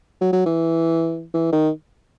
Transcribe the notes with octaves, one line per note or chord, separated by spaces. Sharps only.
F#3
F#3
E3
E3
D#3